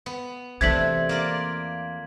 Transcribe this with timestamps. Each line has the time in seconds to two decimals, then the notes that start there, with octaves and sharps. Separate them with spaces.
0.06 B3
0.61 E2 C3 E3 A3 D4 G#6 B6 F#7
1.09 A#3 F4 D5